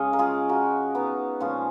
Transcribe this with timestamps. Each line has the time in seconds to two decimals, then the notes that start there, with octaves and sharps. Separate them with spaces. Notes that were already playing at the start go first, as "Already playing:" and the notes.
Already playing: C#3 G#3 C#5 D#5 F5
0.13 A#4
0.19 F4 G#4
0.49 F#4 A#4
0.95 B3 D#4
1.40 A#2 F3 G#3 C#4 F4